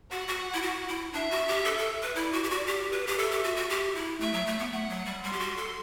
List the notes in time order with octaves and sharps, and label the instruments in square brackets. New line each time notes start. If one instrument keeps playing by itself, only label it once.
[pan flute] F#4 [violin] F#5
[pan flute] F#4
E4
F#4
E4
[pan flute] D4 [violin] E5
[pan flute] F#4
G4
A4
A4
B4
[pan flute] E4 [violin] D5
[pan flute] F#4
G4
F#4
G4
B4
G4
[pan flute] A4 [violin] E5
[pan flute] G4
F#4
F#4
G4
E4
[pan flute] A3 [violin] E5
[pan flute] F#3
A3
B3
[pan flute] A3 [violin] F#5
[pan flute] F#3
G3
[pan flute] G3 [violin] C6
[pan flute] G4
F#4
A4